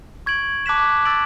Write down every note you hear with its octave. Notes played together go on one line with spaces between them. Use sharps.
C#6 G#6 D7 F#7
A5 D6 F#6 B6 E7
E6 A6 D7 F#7